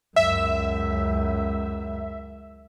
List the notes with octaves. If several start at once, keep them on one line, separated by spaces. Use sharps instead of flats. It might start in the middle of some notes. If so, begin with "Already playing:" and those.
C#2 F#2 E5